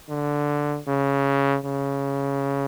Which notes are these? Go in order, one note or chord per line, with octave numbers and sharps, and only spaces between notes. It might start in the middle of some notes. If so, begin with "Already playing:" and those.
D3
C#3
C#3